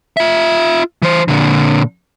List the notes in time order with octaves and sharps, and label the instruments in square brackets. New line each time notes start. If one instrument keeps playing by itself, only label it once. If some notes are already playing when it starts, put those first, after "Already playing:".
[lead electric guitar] F4 E5
E3 C5
A#2 D3